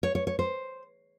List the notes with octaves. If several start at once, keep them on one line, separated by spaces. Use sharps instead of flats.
C#5
C#5
C#5
C5